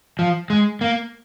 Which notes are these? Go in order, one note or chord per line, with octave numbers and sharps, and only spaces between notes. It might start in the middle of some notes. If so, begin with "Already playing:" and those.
F3
G#3
A#3